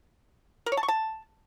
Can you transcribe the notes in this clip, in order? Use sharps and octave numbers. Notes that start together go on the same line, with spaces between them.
A#4
C#5
A5
C#6
A5